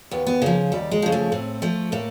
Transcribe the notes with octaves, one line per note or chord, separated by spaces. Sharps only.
D#2 B3
B3
C#3 F3 A#3
D#2 G3
G#3
C#3 F3
A3
A2 C4
F3 A3
A2 A#3